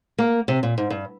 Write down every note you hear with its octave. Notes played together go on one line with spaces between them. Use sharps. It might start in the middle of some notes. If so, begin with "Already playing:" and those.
A#3
C3
A#2
G#2
G2